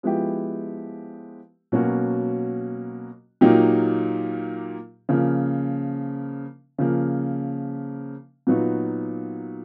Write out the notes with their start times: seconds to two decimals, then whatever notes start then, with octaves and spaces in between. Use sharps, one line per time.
0.03 F3 G#3 B3 E4 G4
1.72 B2 F#3 A#3 C#4 F#4
3.41 A#2 F#3 A#3 D#4 G4
5.09 C#3 F3 A#3
6.78 C#3 F3 A#3
8.47 A#2 F#3 B3 D#4 F#4